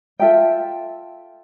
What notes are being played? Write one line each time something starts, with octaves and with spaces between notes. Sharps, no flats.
F4 A4 E5 G5